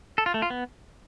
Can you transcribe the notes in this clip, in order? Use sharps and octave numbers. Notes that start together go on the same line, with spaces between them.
A4
F4
A3
F4
B3